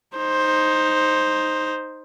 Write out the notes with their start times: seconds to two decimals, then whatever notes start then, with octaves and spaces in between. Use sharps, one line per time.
0.17 D#4 C5